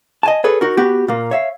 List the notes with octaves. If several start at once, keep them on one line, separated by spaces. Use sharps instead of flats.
D#5 G#5 A5
G#4 A4 B4 C#5
D#4 F#4 A#4
B3 F#4 G4
A#2 A#3
C#5 E5 F5